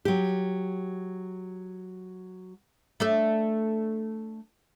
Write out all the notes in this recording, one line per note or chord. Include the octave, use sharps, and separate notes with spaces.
F#3 G4
A3 D4 A4